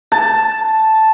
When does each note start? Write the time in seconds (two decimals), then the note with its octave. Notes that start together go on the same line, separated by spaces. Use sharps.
0.12 A5